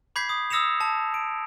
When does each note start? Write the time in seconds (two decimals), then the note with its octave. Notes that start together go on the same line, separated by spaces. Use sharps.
0.16 B5 D6 G6 G#6 B6 C7
0.29 D#6
0.50 D#6 E6 A#6 C#7 E7 F7
0.81 A5
1.14 D7